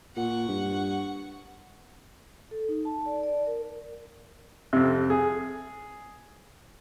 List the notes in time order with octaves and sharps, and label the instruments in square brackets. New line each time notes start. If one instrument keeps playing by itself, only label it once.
[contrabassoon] A#2 [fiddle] F#5 C#6
[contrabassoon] G2
[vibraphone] A4
D#4
A5
D5
D5
A#4
[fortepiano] F2 C3
G#4